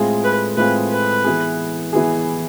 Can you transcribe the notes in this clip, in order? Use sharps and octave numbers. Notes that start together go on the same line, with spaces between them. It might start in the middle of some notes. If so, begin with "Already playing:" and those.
Already playing: A2 G#3 C4 F4 G#4
B4
A2 G#3 C4 F4 G#4 B4
B4
E3 B3 E4 G#4
E3 B3 E4 G#4